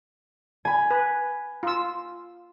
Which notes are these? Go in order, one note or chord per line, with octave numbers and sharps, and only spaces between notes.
G#5 B5
B4
F4 E6